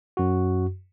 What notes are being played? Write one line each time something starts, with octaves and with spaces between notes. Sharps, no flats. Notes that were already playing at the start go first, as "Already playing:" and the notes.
F#2 F#4